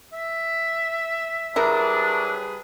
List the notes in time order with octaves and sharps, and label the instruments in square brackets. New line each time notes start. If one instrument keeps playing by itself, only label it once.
[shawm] E5
[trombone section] F#3 D4 [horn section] G3 G#4 B4 [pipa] E4 A#4